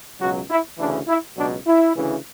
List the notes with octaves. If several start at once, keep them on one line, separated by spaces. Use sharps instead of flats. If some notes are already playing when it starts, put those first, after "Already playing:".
C#2 B2 F#3 F#4
E4
D2 C#3 E3 D4
E4
C#2 B2 F#3 D4
E4
D2 C#3 E3